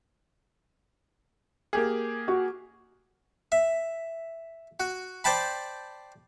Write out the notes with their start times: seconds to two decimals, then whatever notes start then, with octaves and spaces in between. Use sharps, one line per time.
1.73 A#3 G4 G#4
2.28 F#4
3.52 E5
4.80 F#4
5.24 C5 D5 G5 A5 B5